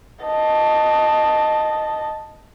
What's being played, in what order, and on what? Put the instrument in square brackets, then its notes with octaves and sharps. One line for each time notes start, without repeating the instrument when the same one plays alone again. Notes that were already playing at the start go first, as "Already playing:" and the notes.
[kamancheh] D#5 A5